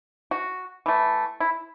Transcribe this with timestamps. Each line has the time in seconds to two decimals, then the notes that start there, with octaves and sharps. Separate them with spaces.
0.31 F#4
0.86 E3 A3
1.40 E4